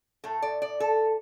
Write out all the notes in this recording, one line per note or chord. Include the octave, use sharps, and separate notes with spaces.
A2 A3 A4
D5
D5
A4